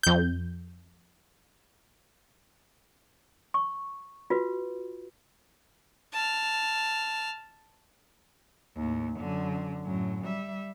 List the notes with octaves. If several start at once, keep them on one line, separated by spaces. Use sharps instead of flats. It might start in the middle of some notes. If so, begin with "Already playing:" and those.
F2 G6
C#6
F4 F#4 B4
A5 F6
D#2 A2
F#2 D3
F#2 A2
G3 E5